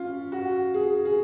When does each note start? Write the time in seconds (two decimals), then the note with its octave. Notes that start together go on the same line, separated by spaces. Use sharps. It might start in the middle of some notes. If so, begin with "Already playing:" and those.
Already playing: C#4 F4
0.32 F#4
0.74 G#4
1.05 G#4